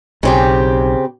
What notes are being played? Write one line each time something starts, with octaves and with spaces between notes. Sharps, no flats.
B1 C#3 C4 G4